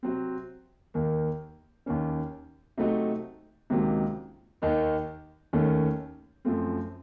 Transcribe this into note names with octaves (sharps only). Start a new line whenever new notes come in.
C3 F#3 C4
D#2 D#3 A#3
D#2 D#3 A#3 C#4
C3 F#3 A3 D#4 F#4
C#2 C3 D#3 F#3 A#3
D#2 D#3 A#3 D#4
D#2 D#3 A3 C#4
F#2 F3 A3 C4